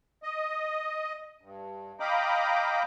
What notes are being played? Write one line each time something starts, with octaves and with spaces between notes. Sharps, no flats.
D#5
G2
D#5 F5 G5 A#5 B5 D6